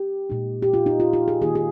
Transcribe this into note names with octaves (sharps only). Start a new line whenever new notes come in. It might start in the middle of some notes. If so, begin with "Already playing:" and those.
Already playing: G4
A#2 G#3 D#4
G4
F4
D#4
F4
F4
G#4
D#3 A#3 D#4 G#4
G#4